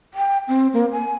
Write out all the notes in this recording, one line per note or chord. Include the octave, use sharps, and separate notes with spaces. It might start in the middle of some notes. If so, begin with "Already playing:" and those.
G5
C4
A#3
G#5